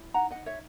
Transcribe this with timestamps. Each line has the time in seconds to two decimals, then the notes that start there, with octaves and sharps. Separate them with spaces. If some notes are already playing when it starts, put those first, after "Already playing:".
Already playing: E4
0.14 D#4 F#5 A#5
0.31 D#4 D#5 F#5
0.46 C#5 E5